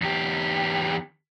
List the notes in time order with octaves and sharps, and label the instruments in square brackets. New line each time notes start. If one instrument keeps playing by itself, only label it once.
[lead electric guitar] E2 G4